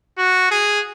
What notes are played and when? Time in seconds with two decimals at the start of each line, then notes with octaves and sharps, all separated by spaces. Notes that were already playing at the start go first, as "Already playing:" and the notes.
0.18 F#4
0.51 G#4